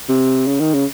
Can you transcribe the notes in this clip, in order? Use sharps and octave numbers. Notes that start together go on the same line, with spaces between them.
C3
C#3
D#3
C#3